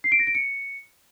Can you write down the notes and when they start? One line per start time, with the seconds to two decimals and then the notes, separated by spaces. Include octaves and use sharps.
0.04 C7
0.12 D7
0.19 A#6
0.27 D7
0.35 C#7